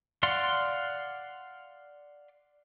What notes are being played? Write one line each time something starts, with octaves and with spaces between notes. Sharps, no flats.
D5 F5 F#5 C6